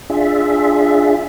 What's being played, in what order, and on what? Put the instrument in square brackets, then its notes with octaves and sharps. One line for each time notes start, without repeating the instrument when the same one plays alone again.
[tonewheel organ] D4 F4 G#4 E5